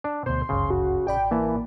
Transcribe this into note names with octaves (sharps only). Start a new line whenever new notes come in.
D4
D2 B2 C5 C6
G1 C#2 F#2 C#3
F#4
A1 D5 G5 B5
E3 A#3 A5